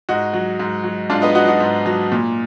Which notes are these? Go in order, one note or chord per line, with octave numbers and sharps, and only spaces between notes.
G#2 D#4 F#4
F#3
G#2
F#3
G#2 D4 F4
B3 D#4
F#3 D#4 F#4
D#4 F#4
G#2
F#3
A#2